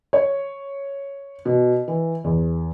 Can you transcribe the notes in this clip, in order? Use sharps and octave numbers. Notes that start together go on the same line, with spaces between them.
C#5
B2
E3
E2